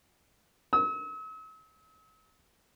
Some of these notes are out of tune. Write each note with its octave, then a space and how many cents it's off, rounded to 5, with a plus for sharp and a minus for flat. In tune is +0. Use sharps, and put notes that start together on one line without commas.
E6 -45